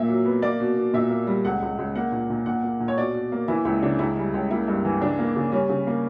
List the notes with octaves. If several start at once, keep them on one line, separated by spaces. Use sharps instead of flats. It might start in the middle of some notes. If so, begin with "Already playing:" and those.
Already playing: A#2 A#3 E5
F#3
B3
A#3 D5
B2
B2
A#2 E5
A#3
G3
C#2 F#5
C#2
C#2
A#3 F#5
A#2
A#2
A#2 F#5
A#3
A#2
C#5
B2 D5
B2
A#3
E3 E4
C#2 E4
C#3 D4
C#2 E4
G3
C#2
A#3 E4
G2
E3
C#3 D4
A#3
C#3
G3 C#4
C#3
A#3